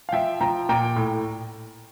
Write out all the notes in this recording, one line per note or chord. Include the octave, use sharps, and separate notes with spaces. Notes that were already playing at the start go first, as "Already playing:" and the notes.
F5
F3 E5 G5
F3 G5 A#5
A#2 G5 A#5
A2